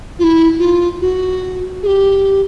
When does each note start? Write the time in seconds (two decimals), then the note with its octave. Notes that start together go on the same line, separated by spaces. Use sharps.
0.19 F4
0.24 E4
0.59 F4
1.01 F#4
1.83 G#4
1.87 G4